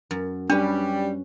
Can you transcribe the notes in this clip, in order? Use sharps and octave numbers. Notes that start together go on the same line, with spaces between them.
F#2
G3 C#4 D4 B4